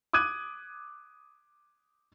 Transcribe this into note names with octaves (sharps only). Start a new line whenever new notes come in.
D6 D#6 F#6 G#6 D#7